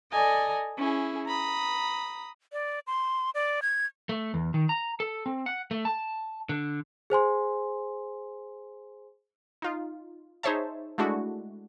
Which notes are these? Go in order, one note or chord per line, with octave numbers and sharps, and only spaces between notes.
A4 D5 D#5 G#5 A#5
C#4 E4 G#4
A#5 B5 D#6
D5
C6
D5
G#6
A3
E2
D#3
A#5
A4
C4
F#5
A3
A5
D3
G#4 C5 G#5 C6
D#4 F4
D#4 G#4 C5 C#5 E5 A5
G#3 A3 D4 E4 F#4